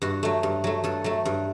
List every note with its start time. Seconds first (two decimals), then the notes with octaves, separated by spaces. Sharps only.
0.02 G2 F#4
0.23 F#3 A3
0.43 G2
0.64 F#3 A3
0.84 G2 A4
1.04 F#3 A3
1.25 G2